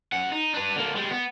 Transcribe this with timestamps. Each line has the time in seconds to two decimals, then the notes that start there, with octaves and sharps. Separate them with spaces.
0.12 F#2 F#5
0.32 D#4
0.54 D4 B4
0.76 D3 A#3
0.96 G3 G#3
1.11 B3